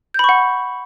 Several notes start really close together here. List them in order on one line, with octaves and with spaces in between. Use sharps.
G6 B5 C#6 F#5